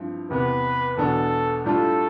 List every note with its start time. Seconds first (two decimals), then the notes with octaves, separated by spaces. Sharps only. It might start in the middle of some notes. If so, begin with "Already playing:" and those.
Already playing: G2 F3 C4 E4
0.30 E2 C3 E3 B3 B4
0.97 E2 B2 B3 D4 A4
1.65 A2 G3 D4 F4 A4